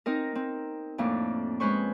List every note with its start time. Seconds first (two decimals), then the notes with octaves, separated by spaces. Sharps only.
0.06 C4 D#4 A#4
0.35 C4
0.98 F2 A2 A#3 D4
1.60 G#3 C#4 B4 C5 C#6